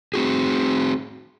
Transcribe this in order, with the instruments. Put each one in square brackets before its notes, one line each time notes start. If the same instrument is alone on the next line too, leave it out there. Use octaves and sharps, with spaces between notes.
[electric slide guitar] C4 F#4 G#4